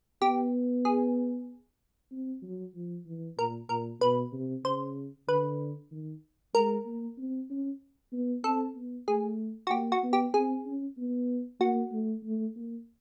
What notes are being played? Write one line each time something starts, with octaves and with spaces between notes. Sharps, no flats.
B3 G4
G#4
C4
F#3
F3
E3
A#2 A#4
A#2 A#4
B2 B4
C3
C#3 C5
D3 B4
D#3
G#3 A#4
A#3
C4
C#4
B3
C4 A4
B3
A3 G#4
F#4
A#3 G4
F#4
B3
G4
C4 G#4
C#4
B3
A#3 F#4
A3
A3
A#3